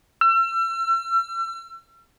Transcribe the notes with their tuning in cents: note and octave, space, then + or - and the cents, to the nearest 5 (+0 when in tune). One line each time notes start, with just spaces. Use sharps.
E6 +40